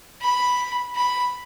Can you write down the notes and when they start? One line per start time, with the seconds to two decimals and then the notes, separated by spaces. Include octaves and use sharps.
0.21 B5
0.96 B5